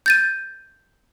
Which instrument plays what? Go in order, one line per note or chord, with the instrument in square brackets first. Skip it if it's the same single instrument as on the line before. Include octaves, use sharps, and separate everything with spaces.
[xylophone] G6 A6 D#7